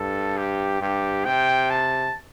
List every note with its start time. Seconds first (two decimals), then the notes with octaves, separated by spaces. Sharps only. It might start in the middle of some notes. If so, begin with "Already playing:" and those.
Already playing: G2 A4
0.38 G4
0.81 G2 G4
1.25 C3 G5
1.70 A5